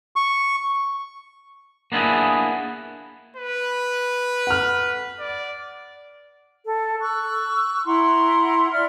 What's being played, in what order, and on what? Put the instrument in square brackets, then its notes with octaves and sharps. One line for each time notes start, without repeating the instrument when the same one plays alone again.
[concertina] C#6
[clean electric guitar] A#3 B3 D4 E4 G#4
[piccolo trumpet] B4
[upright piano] F#5 F6
[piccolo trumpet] D5
[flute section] A4
C#6 E6 F#6
E4 F#5 A#5 C6
D5 E5 B5 F6